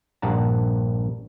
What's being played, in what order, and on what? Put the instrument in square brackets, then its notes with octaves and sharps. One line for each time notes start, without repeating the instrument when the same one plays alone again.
[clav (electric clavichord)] A#1 G2 F#5 A5 A#5